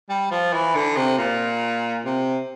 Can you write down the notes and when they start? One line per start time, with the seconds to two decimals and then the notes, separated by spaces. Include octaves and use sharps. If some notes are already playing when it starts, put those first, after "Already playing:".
0.09 G3
0.31 F3
0.53 E3
0.75 D3
0.96 C3
1.18 A#2
2.05 C3